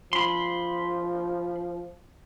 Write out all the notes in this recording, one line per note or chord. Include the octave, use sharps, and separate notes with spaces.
F3 B5 C6